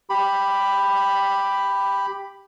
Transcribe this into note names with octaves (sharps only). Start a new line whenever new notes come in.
G4 B5